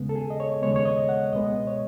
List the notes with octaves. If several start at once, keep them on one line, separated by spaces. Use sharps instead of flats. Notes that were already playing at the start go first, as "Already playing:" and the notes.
Already playing: D#2 C#3 G#3 B3
A4
G#4
D#5
C#5
D#2 C#3 G#3 B3 C#5
C#5
D#5
F#5
C#2 B2 G#3 B3 D#5
C#5